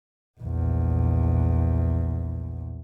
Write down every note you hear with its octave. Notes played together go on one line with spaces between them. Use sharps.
A#1 E2